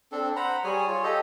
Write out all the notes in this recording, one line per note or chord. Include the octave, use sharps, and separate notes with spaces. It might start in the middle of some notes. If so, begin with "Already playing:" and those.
C4 D4 A4
C5 F#5 A#5 B5
G3 G#4 C#5 G#5
F4 C#5
G4 A4 D#5